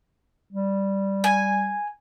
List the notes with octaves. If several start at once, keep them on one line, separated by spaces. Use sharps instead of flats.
G3
G#5